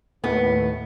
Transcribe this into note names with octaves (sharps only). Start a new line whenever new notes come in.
D#2 A2 D#3 B3 B4